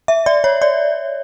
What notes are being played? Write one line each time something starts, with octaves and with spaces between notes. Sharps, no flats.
E5
D5
C#5
D5